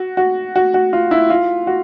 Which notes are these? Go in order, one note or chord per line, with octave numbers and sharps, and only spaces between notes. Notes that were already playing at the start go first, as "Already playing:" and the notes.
Already playing: F#4
F#4
F#4
F#4
F4
E4
F4
F#4